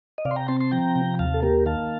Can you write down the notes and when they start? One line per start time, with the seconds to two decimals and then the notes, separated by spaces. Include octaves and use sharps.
0.18 D#5
0.25 C3 D5 F5
0.31 C6
0.36 G5 A#5
0.48 C4 A5 C6
0.61 A5 C6
0.72 F3 G5 A#5
0.96 C3
1.19 D#2 F5 A5
1.34 A4
1.43 A#3 G4 A#4
1.66 D#3 F5 A5